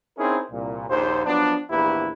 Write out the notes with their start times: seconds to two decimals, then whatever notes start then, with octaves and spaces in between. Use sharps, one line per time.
0.17 C4 C#4 D#4 E4 G#4 A#4
0.50 C2 A#2
0.89 A#1 D#2 C5
1.25 F3 F#3 B3 D4
1.70 A#1 E2 A#3 E4 G4 B4